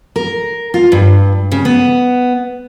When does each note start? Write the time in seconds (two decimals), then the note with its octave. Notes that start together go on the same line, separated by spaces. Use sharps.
0.16 A#4
0.74 F4
0.92 G2
1.52 C#3
1.65 B3